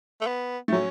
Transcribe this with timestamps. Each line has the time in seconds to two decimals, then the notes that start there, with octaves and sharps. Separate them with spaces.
0.21 A3
0.27 B3
0.68 A3
0.72 F#3 C#4